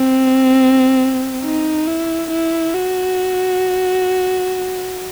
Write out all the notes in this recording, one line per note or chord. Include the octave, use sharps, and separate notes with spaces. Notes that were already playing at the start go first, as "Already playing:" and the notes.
Already playing: C4
D#4
E4
E4
F#4